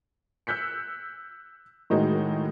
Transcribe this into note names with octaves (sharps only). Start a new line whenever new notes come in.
E6 F#6 G6 B6 C#7
A2 D#3 G#3 D#4 F#4